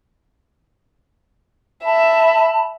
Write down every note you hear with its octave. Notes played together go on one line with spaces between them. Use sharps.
E5 A5 B5